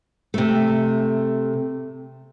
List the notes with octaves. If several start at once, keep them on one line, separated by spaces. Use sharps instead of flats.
C3 A3